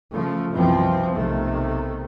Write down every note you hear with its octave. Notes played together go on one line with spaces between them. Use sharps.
C#3 F3 A3
C2 F#2 B2 E3 F3 C4
B1 C3 D#3 A3